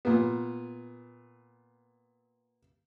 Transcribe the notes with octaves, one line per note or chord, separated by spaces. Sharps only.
A#2 B3